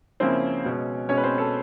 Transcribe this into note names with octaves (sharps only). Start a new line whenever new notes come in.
C#3 F3 A#3 C4 C#4 E4 C5
B2 G#3 C#4
B2 G#3 C#4 C#5
B4
C4 C5
A4